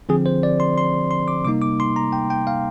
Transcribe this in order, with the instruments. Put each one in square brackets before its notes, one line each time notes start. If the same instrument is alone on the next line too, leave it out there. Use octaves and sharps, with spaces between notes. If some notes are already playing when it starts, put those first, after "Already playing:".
[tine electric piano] D3 F3 C4 G#4
C5
D5
C6
C6
C6
D6
C3 G3 A#3 D#4 D6
D6
C6
A#5
G5
G5
F5